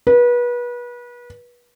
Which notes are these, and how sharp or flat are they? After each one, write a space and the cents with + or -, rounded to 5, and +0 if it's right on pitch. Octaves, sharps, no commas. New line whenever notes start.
B4 -30